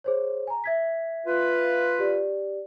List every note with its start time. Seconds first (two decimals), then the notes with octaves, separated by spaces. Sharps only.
0.04 G#4 C5 C#5
0.47 G#5 A#5
0.64 E5 G#6 B6
1.26 F4 B4
1.99 G4 D5